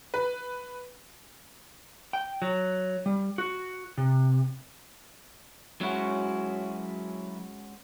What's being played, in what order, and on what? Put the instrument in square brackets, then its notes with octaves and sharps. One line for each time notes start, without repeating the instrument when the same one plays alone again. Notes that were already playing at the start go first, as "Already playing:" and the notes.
[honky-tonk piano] B4
[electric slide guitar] G5
F#3
G3
F#4
C3
[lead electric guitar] F#3 E4 [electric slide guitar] G#3 C#4 F#4